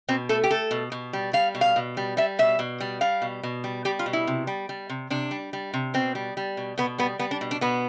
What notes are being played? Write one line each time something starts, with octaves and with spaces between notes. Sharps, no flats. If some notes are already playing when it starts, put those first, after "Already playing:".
B2 C4
A3 A4
G4
A3 A4
B2
B2
G3
G3 F5
B2
F5
B2
G3
G3 E5
B2 E5
B2
G3
G3 F5
B2
B2
G3
G3 G4
F4
B2
E4
C3
G3
G3
C3
C3 D4
G3
G3
C3
B2 C4
G3
G3
B2
B2 B3
G3 B3
G3 B3
D4
B2
D4
B2 B3